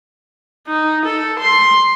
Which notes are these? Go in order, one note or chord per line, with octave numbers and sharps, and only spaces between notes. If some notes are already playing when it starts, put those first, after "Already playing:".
D#4
A4
C6